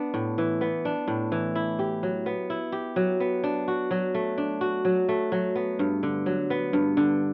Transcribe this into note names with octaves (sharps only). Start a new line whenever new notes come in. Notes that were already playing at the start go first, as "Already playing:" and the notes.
Already playing: B3 D4
A2
E3
B3
D4
A2
E3
E4
G4
F#3
B3
E4
G4
F#3
B3
D4
F#4
F#3
A3
D4
F#4
F#3
A3
F#3
B3
G2
D3
F#3
B3
G2
D3